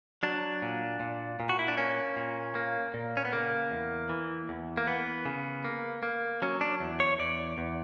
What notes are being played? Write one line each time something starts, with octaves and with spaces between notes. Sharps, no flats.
F#3 D4
A#2
A#2
A#2
F#4
E4
D4
A#3 C#4
A#2
A#3
A#2
C#4
B3
C#3 A#3
E2
E3
E2
A#3
E3 B3
C#3
A#3
A#3
F#3 C#4
D4
E2
C#5
E2 D5
E2